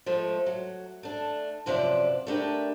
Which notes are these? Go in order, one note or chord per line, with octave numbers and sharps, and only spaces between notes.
F3 G#3 A3
F#3
A3 D4
F#2 C3 F3 B4 D5 E5
A3 B3 D4 G4 A#4 B4